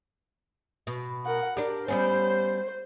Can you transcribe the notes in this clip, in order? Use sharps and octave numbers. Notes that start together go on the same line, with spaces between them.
B2
A#4 F#5
D4 G4 A#4
G3 B3 C#4 C5